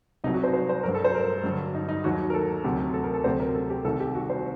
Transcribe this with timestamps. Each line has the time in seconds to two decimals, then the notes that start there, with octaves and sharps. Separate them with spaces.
0.24 C2 C3 F#3 D#4
0.34 F#4
0.44 C5
0.54 C5
0.69 C5
0.83 G2 F#3 A#4
0.94 A4
1.04 C5
1.15 A#4
1.44 G2 D3 F#3
1.75 D#4
1.89 D#4
2.04 D#2 D#3 F#3 F#4
2.30 A#4
2.34 A4
2.64 D2 C3 F#3
2.94 A4
3.04 A#4
3.14 A4
3.24 D2 C3 F#3 C5
3.40 A#4
3.55 A4
3.70 G4
3.85 C2 C3 D#3 A4
4.00 G4
4.15 F#4
4.30 C5